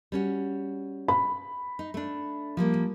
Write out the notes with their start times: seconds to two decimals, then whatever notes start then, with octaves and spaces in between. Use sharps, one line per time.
0.12 G3 C#4 F#4
1.08 B5
1.79 D#4
1.94 A3 D4
2.57 F3 G3 A#3